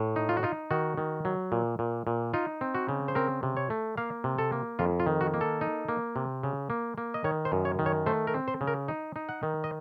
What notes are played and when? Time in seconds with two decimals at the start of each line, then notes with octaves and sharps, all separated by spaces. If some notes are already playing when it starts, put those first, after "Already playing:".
Already playing: A2
0.16 D#4
0.29 F4
0.37 F#4
0.43 D#4 F4
0.71 D#3 F#4
0.98 D#3
1.25 F#3
1.52 A#2
1.79 A#2
2.07 A#2
2.34 D#4 F4
2.61 C4
2.75 F#4
2.89 C#3
3.08 C5
3.15 C4 A#4
3.43 C3
3.57 C#5
3.70 A3
3.97 A#3 F5
4.24 C3
4.38 A4
4.52 A#3
4.79 F2 F4
5.00 F4
5.07 D#3
5.21 F#4
5.34 A#3
5.41 A4
5.61 D#4
5.89 A#3
6.16 C3
6.43 C#3
6.70 A#3
6.98 A#3
7.14 D#5
7.24 D#3 C#5
7.45 C5
7.52 F#2
7.65 C#5
7.79 D#3
7.86 C#5
8.06 A3 C5
8.27 A#4
8.34 C4
8.48 C5
8.61 C#3
8.67 A#4
8.88 D#4
9.16 D#4
9.29 F#5
9.43 D#3
9.64 D#5